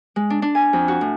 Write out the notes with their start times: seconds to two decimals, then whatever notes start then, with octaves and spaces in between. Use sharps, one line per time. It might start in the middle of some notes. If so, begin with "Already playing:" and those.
0.16 G#3
0.30 D4
0.42 D4
0.55 G#5
0.73 F2
0.88 F#4
1.01 A2